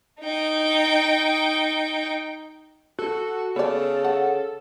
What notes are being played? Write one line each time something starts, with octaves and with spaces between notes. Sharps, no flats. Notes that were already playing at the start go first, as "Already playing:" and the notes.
D#4 G5
F#4 A4
C#3 B3 A4 D5
F#5